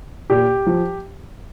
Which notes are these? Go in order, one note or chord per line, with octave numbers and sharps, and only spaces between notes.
A#2 G4
F3